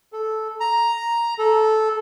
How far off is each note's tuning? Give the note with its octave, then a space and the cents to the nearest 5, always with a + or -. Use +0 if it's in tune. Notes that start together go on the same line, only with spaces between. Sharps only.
A4 -10
A#5 +5
A4 -10